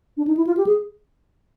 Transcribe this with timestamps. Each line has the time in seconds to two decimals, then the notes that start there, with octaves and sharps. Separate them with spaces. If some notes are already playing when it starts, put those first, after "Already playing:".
0.17 D4
0.27 D#4
0.37 E4
0.47 F4
0.57 G4
0.67 G#4